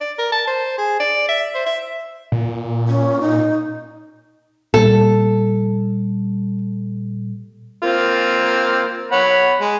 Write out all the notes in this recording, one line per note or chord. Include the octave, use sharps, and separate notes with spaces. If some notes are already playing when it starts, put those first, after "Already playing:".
D5
A#4
A5
C5
G#4
D5
E5
C5
E5
A#2
C#4
D#4
A#2 G3 A4
A#3 C4 F4
C#5 F#5 B5
G#3